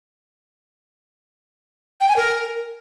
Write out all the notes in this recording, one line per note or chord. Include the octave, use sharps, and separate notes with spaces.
G5
G#5
A#4